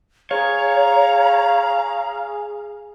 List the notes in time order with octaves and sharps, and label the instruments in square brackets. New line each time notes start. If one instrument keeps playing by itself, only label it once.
[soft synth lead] G#4 [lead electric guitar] C#5 [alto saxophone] F5 [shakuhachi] A#5